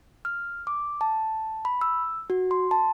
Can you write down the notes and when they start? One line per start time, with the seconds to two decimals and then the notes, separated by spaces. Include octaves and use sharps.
0.25 F6
0.67 D6
1.01 A5
1.65 B5
1.81 E6
2.30 F#4
2.51 C6
2.71 A5